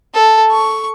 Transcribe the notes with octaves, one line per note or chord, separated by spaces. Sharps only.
A4
C#6